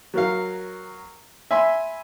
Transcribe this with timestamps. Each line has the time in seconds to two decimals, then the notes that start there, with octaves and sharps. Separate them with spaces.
0.14 F#3 A#4 F5
1.51 E5 G#5 B5 C6